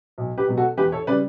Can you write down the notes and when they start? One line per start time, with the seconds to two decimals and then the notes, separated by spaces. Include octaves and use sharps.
0.18 B1
0.38 G4 B4
0.48 B2 F#3 B3
0.57 F#4 A4
0.77 E2 G4 B4
0.92 A4 C#5
1.07 C#3 G3 B4 D5